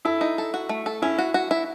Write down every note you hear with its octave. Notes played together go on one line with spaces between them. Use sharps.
E4 A4
D#4
A4
F#4
A3
A4
C#4 E4
F#4
F#4
E4